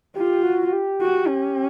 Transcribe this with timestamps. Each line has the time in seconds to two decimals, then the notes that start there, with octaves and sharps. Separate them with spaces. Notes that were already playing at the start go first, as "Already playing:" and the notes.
0.15 F4 G4
0.43 F#4
0.67 F#4
0.73 G4
1.01 F#4
1.28 C#4